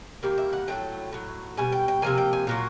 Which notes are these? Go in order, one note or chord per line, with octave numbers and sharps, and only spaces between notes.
D#3 G3 A#3
E5
F#5
A2 F#3 A3 G5
A2 F#3
B2 G3 G#5
G5
G5
C3 F3 A#3 G#5
G5
G#5
A#2 F#3 A#3